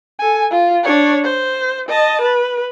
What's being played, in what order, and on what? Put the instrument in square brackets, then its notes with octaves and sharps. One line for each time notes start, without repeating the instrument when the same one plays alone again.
[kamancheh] A4 G#5
F4
D4 C#5
C5
D#5 A5
B4